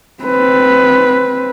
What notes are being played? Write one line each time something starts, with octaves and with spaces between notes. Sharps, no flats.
C4 B4